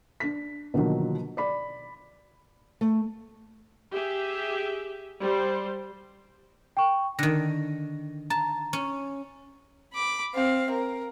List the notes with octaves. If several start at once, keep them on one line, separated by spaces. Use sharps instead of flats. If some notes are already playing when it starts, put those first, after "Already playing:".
D4 B6
B2 D3 D#3 F3 F#3 A#3
D5 B5
A3
G4 G#4 E5
G3 C5
G5 C#6
D3 D#3 A#6
A5 A#5
C#4
B5 D6
C4 F5
A#4